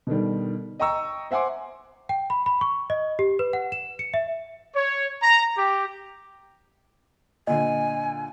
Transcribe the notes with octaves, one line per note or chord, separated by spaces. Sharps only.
B2 D3 D#3 G3
D#5 G5 A#5 C#6 E6
C5 E5 F#5 G#5 C6 D6
G5
B5
B5
C#6
D#5
G4
B4
F#5
E7
C#7
E5
C#5
A#5
G4
A#2 D3 D#5 G#5